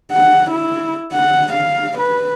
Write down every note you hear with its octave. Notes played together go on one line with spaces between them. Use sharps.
F#5
E4
F#5
F5
B4